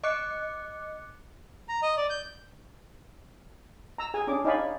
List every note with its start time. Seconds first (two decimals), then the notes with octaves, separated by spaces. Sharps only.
0.04 D#5 D6 F#6 C#7
1.69 A#5
1.82 D#5
1.97 D5
2.10 G6
3.98 A#5 E6
4.14 G#4 G#5
4.27 C#4 D4 G#4 D6
4.45 D#4 C#5 D5 F5 G#5 B5